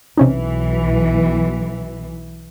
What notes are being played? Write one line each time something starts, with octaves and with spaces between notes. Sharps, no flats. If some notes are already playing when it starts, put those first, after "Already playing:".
B1 C3 E3 C#4 D#4